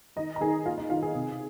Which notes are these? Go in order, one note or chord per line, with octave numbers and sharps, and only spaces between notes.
D#3 D#4 D#5
A#5
D#3 G#4 G#5
A#3 F4 F5
D#4 D#5
D#3 F4 F5
G#4 G#5
C3